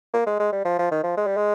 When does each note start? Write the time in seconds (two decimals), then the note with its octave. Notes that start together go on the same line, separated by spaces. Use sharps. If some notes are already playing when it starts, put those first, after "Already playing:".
0.13 A#3
0.26 G#3
0.39 G#3
0.52 G3
0.65 F3
0.79 F3
0.91 D#3
1.03 F3
1.17 G#3
1.26 G3
1.37 G#3